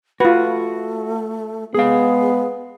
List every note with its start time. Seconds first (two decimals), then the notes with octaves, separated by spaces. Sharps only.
0.20 A3 F4 F#4 B4
1.74 G#3 B3 G#4 F5